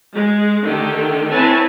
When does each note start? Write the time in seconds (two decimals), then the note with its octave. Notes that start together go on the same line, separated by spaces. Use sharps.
0.12 G#3
0.63 D3 D#3 A3 G4 G5
1.31 C4 E4 B4 C#5 G#5 A5